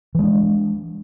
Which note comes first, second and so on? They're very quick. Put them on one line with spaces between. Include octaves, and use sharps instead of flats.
E3 G#3 D4